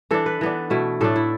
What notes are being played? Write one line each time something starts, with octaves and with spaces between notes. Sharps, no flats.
E3 D4 A4
B4
E3 B3 D4
B2 A3 E4
A2 A3 D4 A4
E4